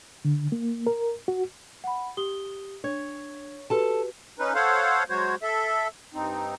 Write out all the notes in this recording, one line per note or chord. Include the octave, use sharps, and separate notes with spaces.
D3
A#3
A#4
F#4
F#5 B5
G4 D#6 G7
D4 C#5 G#6
F#4 G4 A4 B4 A5
C#4 D#4 B4
A4 C5 C#5 F5 F#5
F#3 G#3 F#4 C5 C#5
A4 E5
G2 C4 D#4